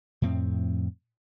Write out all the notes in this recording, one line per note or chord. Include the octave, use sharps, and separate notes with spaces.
F2 A2 C4